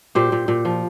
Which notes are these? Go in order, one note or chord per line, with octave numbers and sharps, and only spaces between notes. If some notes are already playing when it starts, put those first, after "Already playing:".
A#2 G4 C5
A#2
A#2
F3